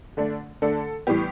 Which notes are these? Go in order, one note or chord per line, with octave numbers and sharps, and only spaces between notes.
D3 A3 D4
D3 A3 D4 A4
A2 E3 G3 B3 G4